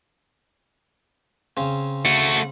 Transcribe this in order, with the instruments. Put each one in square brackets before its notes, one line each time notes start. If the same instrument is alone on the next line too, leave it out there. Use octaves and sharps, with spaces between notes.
[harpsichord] C#3 C4
[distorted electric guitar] A3 F#4